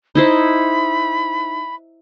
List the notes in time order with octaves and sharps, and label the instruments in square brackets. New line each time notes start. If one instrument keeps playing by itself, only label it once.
[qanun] D#4 E4 C5 [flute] B5